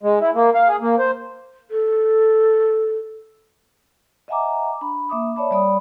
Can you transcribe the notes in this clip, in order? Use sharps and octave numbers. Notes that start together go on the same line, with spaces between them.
G#3
E4
A#3
F5
G#4
A#3
C5
A4
D#5 E5 F#5 G#5 A#5 D6
D4 B5
A#3 E5 D6 D#6
C#5 D5 E5 A5 B5
G3 D5 B5 D#6